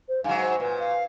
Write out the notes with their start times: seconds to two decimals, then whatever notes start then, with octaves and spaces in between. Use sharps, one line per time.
0.09 C5
0.24 G#2 F#3 F5 G#5
0.41 C5
0.60 A#2 B4
0.79 F5